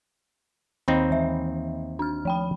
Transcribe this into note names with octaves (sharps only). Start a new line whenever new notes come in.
D#2 C4 D#4 B5
E3 E5
D4 F6
F3 G5 B5